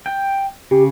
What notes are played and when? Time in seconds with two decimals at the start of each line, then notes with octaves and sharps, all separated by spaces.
0.06 G5
0.71 C#3 G4